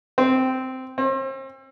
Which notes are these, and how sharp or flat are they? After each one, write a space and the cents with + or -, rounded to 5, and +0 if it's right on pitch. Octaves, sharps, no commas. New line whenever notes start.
C4 -10
C4 +40